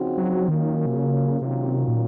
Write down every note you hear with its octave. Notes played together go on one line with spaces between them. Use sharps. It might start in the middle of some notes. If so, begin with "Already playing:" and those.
Already playing: C#3 F3 C4 D#4 F#4
F#3
A#2 D#3 F#3 A#3 C#4
C3
C#3
C3 D#3 F#3 A#3 C#4 F4
A#2